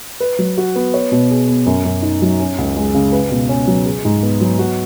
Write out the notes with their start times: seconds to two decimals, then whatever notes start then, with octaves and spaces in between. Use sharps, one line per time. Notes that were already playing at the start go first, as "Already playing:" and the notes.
0.20 B4
0.39 F#3
0.57 F#4
0.76 B3
0.94 C#5
1.12 B2
1.30 G#4
1.48 B3
1.66 F#2
1.85 F#2
2.02 D#4
2.22 F#3
2.40 C#4
2.58 C#2
2.77 G#3
2.94 C#3
3.12 B4
3.31 B2
3.49 C#4
3.67 F#3
3.86 G#4
4.05 G#2
4.23 B3
4.41 F#3
4.59 F#4